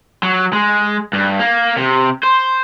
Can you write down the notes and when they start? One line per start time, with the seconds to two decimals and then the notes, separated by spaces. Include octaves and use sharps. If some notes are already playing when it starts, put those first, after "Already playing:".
0.23 F#3
0.53 G#3
1.13 G2
1.40 A#3
1.77 C3
2.23 C5